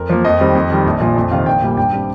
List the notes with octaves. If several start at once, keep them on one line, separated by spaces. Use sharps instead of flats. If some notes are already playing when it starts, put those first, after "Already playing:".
Already playing: F2 A#4
F3 A#3
F2 D#5
D#3 G3 C4
F2
D#3 G3
A#1
A#2 F3
F2
C3 D#3 C4 F5
A#1 G5
A#2 G3 A#3
G2 G5
G3 C4